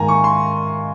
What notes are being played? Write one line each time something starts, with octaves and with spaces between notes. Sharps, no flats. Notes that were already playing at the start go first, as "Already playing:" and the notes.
Already playing: G#2 D#3 A#3 G#5 A#5
C#6
C6